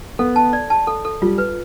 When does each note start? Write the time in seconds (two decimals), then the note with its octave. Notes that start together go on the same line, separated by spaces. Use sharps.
0.19 B3 A4
0.36 A5
0.53 D5
0.70 A5
0.87 A4
1.05 A4
1.22 G3 F4
1.38 B4